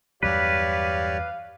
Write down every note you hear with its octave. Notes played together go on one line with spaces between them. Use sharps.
E2 G2 F#3 G4 B4 C#5 D5 F5